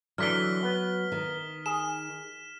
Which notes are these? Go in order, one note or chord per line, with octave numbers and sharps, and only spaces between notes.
D3 E3 F#3 D4 F6 B6 G7
B3 B4
D#3
G#4 E7